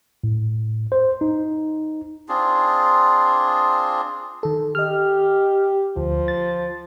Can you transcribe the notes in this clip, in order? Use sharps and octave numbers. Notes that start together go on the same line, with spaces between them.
A2
C5
D#4
C4 D4 F4 G#4
D#3 A4
G4 D#5 F6
D2 F3
A6